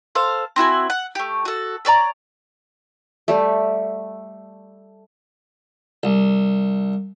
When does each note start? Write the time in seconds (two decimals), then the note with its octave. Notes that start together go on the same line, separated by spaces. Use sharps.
0.15 A4 C5 F5
0.56 C4 E4 F#4 G#5
0.90 F#5
1.15 A3 G4
1.45 F#4 A4
1.85 A4 C#5 D5 A#5
3.28 G3 A3
6.03 C2